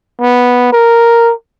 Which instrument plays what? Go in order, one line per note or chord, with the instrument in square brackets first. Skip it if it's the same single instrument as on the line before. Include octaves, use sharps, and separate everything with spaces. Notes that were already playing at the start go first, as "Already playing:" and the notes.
[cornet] B3
A#4